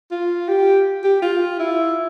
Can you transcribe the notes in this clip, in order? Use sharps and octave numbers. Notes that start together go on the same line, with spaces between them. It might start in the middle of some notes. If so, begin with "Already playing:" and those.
F4
G4
G4
F4
E4